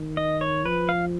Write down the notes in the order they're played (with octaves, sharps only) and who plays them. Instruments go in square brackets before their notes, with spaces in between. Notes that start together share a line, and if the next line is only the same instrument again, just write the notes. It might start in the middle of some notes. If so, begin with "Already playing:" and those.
Already playing: [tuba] D#3
[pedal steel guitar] D#5
C#5
[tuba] F3 [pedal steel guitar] B4
[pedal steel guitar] F5